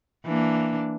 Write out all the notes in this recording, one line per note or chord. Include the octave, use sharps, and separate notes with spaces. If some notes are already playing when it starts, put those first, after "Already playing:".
E3 A#3 D4